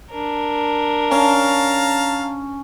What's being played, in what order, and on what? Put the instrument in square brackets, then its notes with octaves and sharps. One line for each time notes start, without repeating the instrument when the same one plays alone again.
[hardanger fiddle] D4 A#4
[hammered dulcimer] C#4 [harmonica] F5 A5 A#5